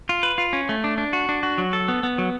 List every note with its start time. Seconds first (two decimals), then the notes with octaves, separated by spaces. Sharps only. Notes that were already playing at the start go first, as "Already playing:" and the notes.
0.09 F4
0.23 B4
0.38 F4
0.53 C#4
0.69 A3
0.84 D4
0.98 D4
1.13 F#4
1.29 D4
1.43 F#4
1.58 F#3
1.73 A4
1.88 B3
2.03 B3
2.18 F#3